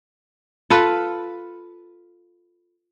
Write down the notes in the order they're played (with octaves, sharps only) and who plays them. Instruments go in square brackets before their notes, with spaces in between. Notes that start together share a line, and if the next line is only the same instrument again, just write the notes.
[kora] F4 A4 B4